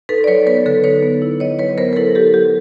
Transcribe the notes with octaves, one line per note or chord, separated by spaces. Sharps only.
D#4 A4 B4
D5
F#3 B4 C#5
B3 B4 C#5
D3 A4 B4
D#4 B4 C#5
B3
E4
F#3 C#5 D#5
F#3 B4 C#5
B3 A#4 C5
A#4
E4 A4 B4
F#3 G4 A4
F#3 G4